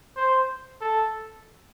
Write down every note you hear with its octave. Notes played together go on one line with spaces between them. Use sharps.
C5
A4